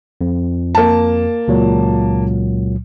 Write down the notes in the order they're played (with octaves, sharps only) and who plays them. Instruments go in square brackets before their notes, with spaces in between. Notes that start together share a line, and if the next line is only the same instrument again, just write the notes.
[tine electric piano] F2
[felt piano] A#3 A5
[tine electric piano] C#2 A#2 F#3